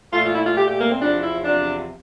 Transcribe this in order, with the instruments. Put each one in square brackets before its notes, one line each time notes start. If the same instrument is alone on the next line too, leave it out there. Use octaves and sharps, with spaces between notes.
[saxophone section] A#2 A3 F4
F4
E4
F4
A#2 A3 G4
G4
A#3
C4
E2 C3 F3 D4
E4
E2 C3 F3 D4